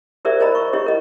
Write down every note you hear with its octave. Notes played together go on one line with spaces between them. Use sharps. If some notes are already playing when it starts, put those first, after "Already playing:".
E4 G4 A#4 C5 D5 E5
A#4 C5 D#5 A#5 B5
C#6
E4 G4 C#5 D#5
A#4 D#5